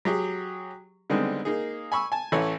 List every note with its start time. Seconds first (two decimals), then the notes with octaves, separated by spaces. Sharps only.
0.05 F#3 G4 G#4
1.10 D3 D#3 G3 G#3 B3 C4
1.45 A#3 D#4 G#4
1.92 G#5 B5 C#6 E6
2.12 G#5 A5
2.32 A1 E3 A4 B4 C#5